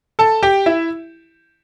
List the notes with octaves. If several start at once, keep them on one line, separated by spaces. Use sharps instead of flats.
A4 A5
G4 G5
E4 E5